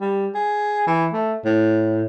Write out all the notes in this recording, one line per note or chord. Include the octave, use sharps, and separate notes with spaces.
G3
G#4
E3
A3
A2